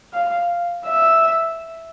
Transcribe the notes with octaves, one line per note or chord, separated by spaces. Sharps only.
F5
E5